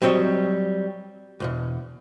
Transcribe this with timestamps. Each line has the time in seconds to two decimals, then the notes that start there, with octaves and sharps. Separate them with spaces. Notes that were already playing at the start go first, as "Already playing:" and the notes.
0.02 F#3 G3 C4 C#5 D#5
1.40 B1 E2 B2